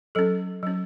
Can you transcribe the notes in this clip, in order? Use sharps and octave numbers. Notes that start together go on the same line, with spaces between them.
F#3 C#4 A4
F#3 C#4